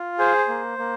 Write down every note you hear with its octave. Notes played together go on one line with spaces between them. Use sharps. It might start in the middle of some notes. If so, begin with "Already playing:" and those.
Already playing: F4
G#4 C5
A#3
A#3